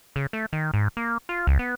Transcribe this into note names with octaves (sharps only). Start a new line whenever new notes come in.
C#3
A3
D#3
G#2
A#3
F4
C#2
B3